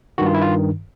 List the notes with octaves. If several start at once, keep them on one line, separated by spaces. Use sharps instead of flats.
G2 D#3 F#4
F4
E4
F4